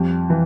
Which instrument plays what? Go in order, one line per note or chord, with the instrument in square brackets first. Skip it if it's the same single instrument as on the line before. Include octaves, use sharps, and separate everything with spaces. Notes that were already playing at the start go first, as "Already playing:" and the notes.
Already playing: [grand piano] F2 G3
E3